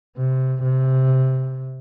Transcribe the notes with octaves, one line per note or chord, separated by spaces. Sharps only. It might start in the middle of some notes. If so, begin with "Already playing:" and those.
C3
C3